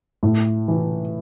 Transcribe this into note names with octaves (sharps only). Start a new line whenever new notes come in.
A2
E3